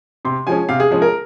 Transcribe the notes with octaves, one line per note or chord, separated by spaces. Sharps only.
C3 C6
F3 G#3 C#4 G#5
C3 F5
G#4
F3 G#3 C#4 G#4
A#4